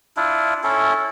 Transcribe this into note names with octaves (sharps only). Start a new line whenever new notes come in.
D4 E4 F4
C#4 E4 A4